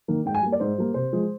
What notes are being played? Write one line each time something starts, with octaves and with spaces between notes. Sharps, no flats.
D#3 A#3
G#2 G5
G#5
G3 A#3
D5
G#2 C5
G3 A#3
C3 C5
F3 G#3